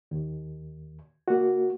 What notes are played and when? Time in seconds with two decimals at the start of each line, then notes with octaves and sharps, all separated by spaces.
0.11 D#2
1.28 A#3 F#4